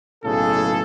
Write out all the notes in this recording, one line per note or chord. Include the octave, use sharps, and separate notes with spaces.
B1 A2 C#3 A#3 G#4 A4